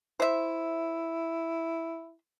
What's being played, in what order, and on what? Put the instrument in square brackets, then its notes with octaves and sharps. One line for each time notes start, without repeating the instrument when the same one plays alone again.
[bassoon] E4 [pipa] C5 E5